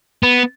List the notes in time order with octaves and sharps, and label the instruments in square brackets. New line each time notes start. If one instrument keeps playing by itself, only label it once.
[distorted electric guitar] B3